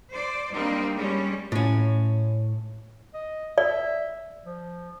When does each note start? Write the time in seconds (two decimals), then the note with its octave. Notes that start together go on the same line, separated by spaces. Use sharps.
0.12 C5 D5
0.52 G3 A#3 C4 D4 D#4
0.96 G3 G#3 C#4
1.52 A2 C#4
3.14 D#5
3.58 D5 E5
4.45 F3